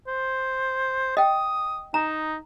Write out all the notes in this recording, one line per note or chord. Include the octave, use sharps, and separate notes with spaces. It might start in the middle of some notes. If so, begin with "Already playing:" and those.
C5
D#5 G5 D#6
D#4 A#5